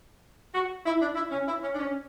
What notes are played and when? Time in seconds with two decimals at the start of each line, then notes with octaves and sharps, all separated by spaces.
0.53 F#4
0.85 E4
1.00 D4
1.15 E4
1.31 C#4
1.47 E4
1.62 C#4
1.73 D4
1.78 C#4